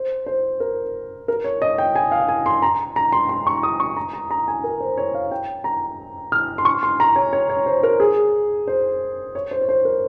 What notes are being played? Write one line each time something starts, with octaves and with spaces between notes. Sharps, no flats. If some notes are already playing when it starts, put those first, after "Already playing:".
Already playing: C5
C5
A#4
A#4
C#5
D#5
G5
G#5
F5
G#5
C6
A#5
A#5
C6
C6
C#6
D#6
C#6
A#5
A#5
A#5
G#5
A#4
C5
C#5
F5
G5
A#5
F6
C6
C#6
C6
A#5
C#5
C#5
C#5
C5
A#4
G#4
C5
C#5
C5
C#5
C5
A#4